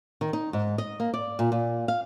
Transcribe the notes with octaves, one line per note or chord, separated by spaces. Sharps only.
D#3
D#4
G#2
D#5
A#3
D5
A#2
A#2
F5